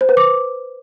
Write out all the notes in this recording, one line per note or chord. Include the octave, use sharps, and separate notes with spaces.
C5
B4
D6